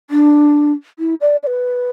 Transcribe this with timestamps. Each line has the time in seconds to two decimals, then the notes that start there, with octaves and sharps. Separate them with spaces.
0.10 D4
0.99 E4
1.21 D5
1.43 D5
1.47 B4